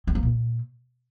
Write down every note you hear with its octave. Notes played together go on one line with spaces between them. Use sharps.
C4
A#3
A#2